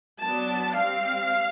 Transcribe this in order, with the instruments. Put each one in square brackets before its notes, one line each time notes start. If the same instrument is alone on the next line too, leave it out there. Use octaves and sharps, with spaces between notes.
[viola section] F#3 B3 D4 A5
G3 C4 F5